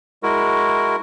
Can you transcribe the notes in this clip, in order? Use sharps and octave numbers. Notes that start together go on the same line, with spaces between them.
G#3 E4 F#4 A#4